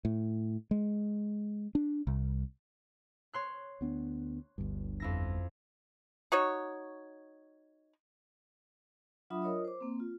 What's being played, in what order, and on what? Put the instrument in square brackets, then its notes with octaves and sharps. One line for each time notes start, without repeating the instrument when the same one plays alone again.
[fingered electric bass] A2
G#3
D4
C2
[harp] C#5 C6 F#6
[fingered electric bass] D2 B3 D4
G1 D2 G2
[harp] F2 E4 A#6
[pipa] D#4 F#4 C#5
[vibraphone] F#3 D4 F4 E5 B5 D#6
F4 A#4 C#5 D#5 D#6
C5 D6
A#3 C4
F4